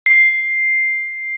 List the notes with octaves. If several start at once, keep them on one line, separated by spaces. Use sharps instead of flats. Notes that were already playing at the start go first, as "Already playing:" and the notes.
C7